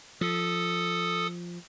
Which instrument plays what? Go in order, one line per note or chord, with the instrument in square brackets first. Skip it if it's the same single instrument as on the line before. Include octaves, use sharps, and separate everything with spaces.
[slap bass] F3 [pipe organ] A4 D#6